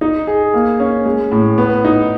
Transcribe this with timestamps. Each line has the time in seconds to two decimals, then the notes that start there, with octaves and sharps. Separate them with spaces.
0.01 D#4
0.27 G#4
0.54 A#3
0.80 C#4
1.05 G#3
1.31 A2
1.58 B3
1.85 D#4